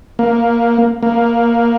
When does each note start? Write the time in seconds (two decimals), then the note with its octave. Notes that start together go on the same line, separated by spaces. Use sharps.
0.19 A#3
1.03 A#3